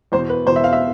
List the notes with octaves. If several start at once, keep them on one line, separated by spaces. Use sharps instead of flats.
E2 B2 C5
B4
E2 B2 C5
E5
F5
E5